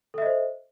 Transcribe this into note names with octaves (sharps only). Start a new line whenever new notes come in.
A4 C5 D#5 E5